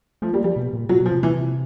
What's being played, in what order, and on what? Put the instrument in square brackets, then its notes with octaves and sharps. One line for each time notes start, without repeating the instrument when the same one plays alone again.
[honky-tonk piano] F3 [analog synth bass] A3
[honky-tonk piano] G3 [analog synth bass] A#3
[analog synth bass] F3 [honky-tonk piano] G3
[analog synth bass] B2
A#2
[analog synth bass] B2 [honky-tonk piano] F#3
[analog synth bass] B2
[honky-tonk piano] F3
[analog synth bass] C3
[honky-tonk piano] E3